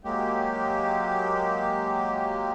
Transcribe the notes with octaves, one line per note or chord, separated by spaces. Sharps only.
F#3 G#3 A#3 G4